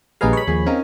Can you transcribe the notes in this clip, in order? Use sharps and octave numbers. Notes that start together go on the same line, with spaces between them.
A#1 G3 G#4 B4 D#5 F5 G#5 A#5
C#5 B5
D#2 F3 A#3 G#4
C4 C#4 D#4 A#4 F5